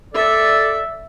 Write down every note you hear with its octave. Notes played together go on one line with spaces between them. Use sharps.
A4 D5 E5